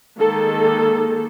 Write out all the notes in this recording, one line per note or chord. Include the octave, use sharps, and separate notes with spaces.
D#3 G#3 A#3 A4